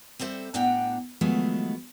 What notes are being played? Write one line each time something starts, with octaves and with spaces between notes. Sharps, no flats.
G3 C4 A4 C5 E5
A2 B3 D4 F#5 G5 A#5
D#3 F3 F#3 G#3 A3 B3